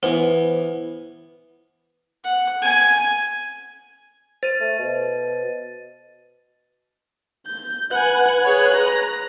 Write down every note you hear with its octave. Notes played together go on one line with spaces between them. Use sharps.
E3 B3 C5
F#5
G#5
C5 A6 D#7
A3
B2
G6
B4 F#5 G#5 F#6
G#4 C#5
A#5